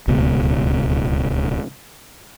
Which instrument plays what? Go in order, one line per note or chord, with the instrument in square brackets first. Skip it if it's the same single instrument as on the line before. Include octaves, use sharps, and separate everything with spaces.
[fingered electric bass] D1 C#2 B2